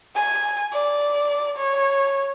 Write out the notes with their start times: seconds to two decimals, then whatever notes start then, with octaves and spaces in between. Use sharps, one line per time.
0.15 G#5
0.73 D5
1.58 C#5